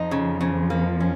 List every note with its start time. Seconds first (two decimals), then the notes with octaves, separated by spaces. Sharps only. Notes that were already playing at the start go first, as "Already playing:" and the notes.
Already playing: F2 F3 D#4
0.11 C#3
0.41 C#3
0.70 A#3
1.00 C#4